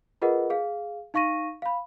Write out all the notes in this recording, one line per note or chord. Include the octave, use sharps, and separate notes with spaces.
F4 G#4 A#4 B4 D#5 F#5
G#4 F5
D#4 F5 C#6 A#6 D#7
F5 B5